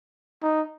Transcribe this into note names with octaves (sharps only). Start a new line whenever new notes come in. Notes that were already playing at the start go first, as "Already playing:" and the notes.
D#4